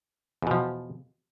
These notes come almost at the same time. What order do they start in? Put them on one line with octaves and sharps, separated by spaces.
E2 B2 F3